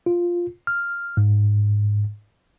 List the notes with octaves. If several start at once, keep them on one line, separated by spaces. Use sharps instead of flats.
F4
F6
G#2